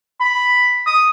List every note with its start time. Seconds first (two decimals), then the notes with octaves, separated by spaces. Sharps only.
0.21 B5
0.86 D#6